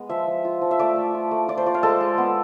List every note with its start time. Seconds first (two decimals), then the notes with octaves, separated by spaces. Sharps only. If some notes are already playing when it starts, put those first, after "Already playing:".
Already playing: G#3 B3
0.09 F3 E5
0.27 F3
0.45 F4
0.61 F3
0.71 E5
0.79 A3 D5
0.97 A3
1.14 F4
1.31 A3
1.48 F4 D5
1.57 C5
1.66 F4 D5
1.74 F5
1.83 G#3 A4
2.01 G#3
2.18 B3